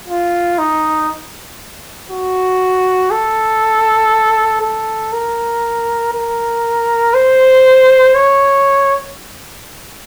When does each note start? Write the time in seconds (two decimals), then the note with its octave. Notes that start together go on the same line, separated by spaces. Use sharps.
0.09 F4
0.59 D#4
2.10 F#4
3.11 A4
4.62 A4
5.13 A#4
6.14 A#4
7.14 C5
8.15 C#5